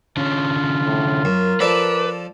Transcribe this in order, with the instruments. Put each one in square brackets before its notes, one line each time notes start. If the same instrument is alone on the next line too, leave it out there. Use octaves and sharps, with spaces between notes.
[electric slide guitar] D3 C#4 [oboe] F4
[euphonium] A2
[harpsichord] F#2 [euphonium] A#4
[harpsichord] F3 A4 D5 [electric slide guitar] B4 [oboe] D6